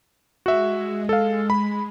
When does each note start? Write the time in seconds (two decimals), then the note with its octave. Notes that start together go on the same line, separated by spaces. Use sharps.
0.46 G#3 F#4 E5
1.09 A4 F5
1.50 B5